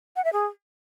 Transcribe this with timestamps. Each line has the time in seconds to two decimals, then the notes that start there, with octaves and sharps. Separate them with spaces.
0.16 F#5
0.25 E5
0.33 G#4